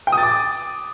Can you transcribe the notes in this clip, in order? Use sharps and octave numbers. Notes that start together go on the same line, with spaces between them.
G5
D#6
A6
D6